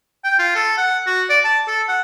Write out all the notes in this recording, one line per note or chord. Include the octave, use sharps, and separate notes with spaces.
G5
F4
A4
F#5
F#4
D5
A5
A4
F#5